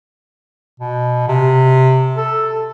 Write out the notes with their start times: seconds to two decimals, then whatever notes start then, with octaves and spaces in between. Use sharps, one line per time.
0.80 B2
1.28 C3
2.17 A4